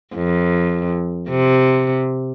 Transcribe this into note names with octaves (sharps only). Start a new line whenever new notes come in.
F2
C3